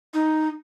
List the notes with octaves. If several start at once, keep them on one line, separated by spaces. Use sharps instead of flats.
D#4